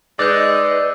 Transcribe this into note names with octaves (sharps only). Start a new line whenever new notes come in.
G#3 D#4 B4 D5 E6 F#6 G6